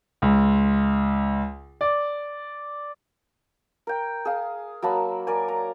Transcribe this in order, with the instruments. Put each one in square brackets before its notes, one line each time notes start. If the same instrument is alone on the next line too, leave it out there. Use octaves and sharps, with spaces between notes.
[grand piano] C#2
D5
[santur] A#4 G5
G#4 F5
F#3 A#3 A5 B5
A#4 D5 G#5
A#5